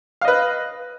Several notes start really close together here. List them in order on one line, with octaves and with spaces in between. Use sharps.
F5 D#5 B4